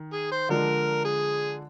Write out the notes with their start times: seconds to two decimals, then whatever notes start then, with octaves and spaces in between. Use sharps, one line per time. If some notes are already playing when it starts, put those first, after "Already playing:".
Already playing: D#3
0.12 G#4
0.31 C5
0.49 D3 F3 G#3 D4 A#4
1.05 G#4